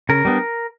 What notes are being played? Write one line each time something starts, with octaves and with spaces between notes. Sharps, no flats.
C#3 A#4
G3 B3 D4